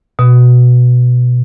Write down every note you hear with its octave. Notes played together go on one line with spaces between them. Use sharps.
B2